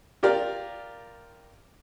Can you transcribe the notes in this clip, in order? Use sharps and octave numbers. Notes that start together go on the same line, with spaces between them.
F4 G4 A#4 D5